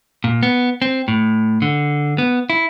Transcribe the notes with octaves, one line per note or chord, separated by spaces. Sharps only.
A#2
B3
C4
A2
D3
B3
E4